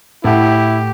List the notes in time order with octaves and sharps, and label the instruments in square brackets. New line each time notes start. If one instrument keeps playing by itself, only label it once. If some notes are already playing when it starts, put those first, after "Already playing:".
[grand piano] A2 F#5 [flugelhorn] E4 [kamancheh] G4